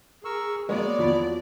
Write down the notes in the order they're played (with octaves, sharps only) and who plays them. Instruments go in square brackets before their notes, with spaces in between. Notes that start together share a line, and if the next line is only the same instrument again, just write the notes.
[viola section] G#4 [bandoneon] A#4 C#6 E6
[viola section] F#3 D5 [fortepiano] G#3 A#3 [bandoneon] B3 C#5
[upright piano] E2 F3 B5